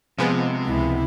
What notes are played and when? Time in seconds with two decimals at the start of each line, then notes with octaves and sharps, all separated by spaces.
0.18 C3 F3 G#3 B3
0.66 C#2 E4